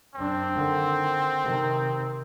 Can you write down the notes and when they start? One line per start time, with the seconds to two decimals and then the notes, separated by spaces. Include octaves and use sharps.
0.15 F#2 C4 D4
0.55 D3 D#3
1.43 C3 D#3